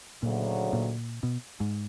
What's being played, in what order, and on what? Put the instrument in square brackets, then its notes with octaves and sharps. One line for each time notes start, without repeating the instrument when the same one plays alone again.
[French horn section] D2 C#3 F#3 [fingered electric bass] A#2
[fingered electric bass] A#2
B2
G#2